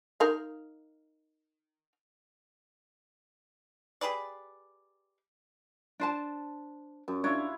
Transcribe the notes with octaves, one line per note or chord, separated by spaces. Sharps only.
D#4 A#4 F5
G4 G#4 B4 D5
D4 C5 A5
F#2
D4 E4 F4 C#5